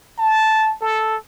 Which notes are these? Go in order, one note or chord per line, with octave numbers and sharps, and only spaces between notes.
A5
A4